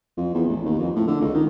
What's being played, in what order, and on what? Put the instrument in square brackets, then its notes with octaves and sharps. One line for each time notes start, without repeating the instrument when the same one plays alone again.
[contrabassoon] F2
E2
A1
D#2
F2
A2
D3
C#2
D#3